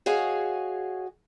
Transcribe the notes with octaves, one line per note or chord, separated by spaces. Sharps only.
F#4 G#4 C#5 D#5 F5 G#5